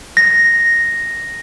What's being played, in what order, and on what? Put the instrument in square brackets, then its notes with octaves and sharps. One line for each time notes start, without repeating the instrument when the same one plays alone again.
[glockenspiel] A#6